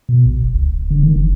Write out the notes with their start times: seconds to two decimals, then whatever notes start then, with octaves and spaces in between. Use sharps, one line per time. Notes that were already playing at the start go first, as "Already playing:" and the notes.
0.09 B2
0.26 A#1
0.43 E1
0.55 C#2
0.74 D#1
0.91 D3
1.03 D#3
1.16 F1